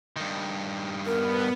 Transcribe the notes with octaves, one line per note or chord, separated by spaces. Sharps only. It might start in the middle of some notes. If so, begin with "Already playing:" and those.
G2 D#3
B3 A#4